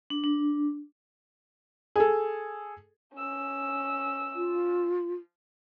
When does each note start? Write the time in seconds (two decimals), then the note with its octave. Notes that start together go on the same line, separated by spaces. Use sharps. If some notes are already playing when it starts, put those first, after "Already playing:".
0.10 D4
0.24 D4
1.96 G#4 A4
3.15 C#4 E6
4.35 F4